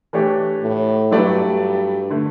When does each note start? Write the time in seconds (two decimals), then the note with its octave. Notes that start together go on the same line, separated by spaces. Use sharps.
0.13 E3 A3 D4 G4 C#5
0.62 A2
1.11 G2 F#3 A3 E4 B4 D5
2.10 D3 A3